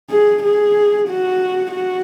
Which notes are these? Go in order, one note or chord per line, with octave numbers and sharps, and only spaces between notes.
G#4
G#4
F#4
F#4